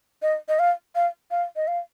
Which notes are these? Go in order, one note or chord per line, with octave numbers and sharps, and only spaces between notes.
D#5
D#5
F5
F5
F5
D#5
F5